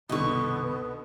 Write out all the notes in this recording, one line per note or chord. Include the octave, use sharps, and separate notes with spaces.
G1 C2 B2 D3 D#3 B3 D#5 C#6